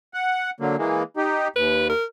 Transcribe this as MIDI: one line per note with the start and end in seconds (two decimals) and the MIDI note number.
0.14 0.50 78
0.60 0.76 50
0.60 0.76 54
0.60 0.76 58
0.78 1.03 52
0.78 1.03 56
0.78 1.03 58
1.17 1.48 63
1.17 1.48 67
1.56 1.93 39
1.56 1.88 71
1.89 2.04 70